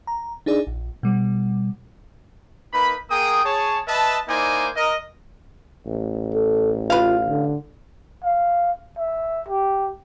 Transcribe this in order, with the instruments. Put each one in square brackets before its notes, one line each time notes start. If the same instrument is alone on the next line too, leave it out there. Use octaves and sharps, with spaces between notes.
[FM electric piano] A#5
D4 D#4 G#4 D5
A#1
B2 G3
[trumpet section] A#3 D#4 B4 B5
A#3 G#4 A#4 G5 D#6
G#4 C#5 A5
B4 D#5 E5 A5
A#3 D#4 E4 C5 D5 G#5
A#4 D#5
[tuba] A1
[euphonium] A4
[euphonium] F4 [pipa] B4 F5
[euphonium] D3
[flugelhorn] F5
E5
G4